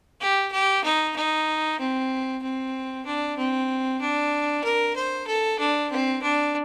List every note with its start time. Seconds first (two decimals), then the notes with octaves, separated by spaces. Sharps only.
0.20 G4
0.52 G4
0.84 D#4
1.15 D#4
1.79 C4
2.42 C4
3.06 D4
3.37 C4
4.00 D4
4.64 A#4
4.96 C5
5.27 A4
5.59 D4
5.91 C4
6.22 D4